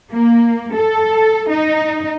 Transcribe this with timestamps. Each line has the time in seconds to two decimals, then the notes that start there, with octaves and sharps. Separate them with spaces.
0.11 A#3
0.75 A4
1.50 D#4